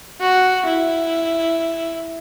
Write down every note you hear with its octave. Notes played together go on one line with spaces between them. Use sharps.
F#4
E4